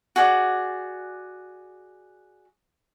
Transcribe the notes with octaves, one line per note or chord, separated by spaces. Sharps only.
F#4 G#4 D5